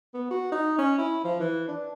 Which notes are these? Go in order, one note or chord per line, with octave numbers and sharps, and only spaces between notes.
B3
F#4
D#4
C#4
E4
F3
E3
D4